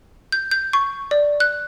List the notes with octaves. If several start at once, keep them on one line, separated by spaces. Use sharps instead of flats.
G6
G6
C#6
D5
F#6